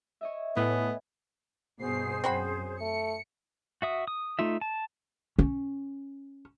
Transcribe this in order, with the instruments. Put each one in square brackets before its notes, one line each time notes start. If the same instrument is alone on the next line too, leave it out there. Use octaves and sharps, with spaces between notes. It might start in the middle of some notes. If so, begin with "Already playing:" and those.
[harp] C#5 D#5 E5
[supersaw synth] A2 [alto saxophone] B3 [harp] B4 G#5
[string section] G2 B2 C7 [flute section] G#4 C5
[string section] F#2 [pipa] C4 F#4 B5
[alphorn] A3 [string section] C#7
[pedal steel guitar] F#4 E5 D#6
D#6
A3 D#4 F4 E5
A5
[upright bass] C#4